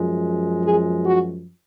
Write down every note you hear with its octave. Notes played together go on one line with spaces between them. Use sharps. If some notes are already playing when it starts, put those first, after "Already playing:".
Already playing: F#2 F3 G#3
G#4
F#4